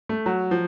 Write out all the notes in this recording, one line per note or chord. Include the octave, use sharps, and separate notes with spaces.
A3
F#3
F3